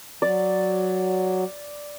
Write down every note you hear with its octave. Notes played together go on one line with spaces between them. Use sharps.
F#3 D5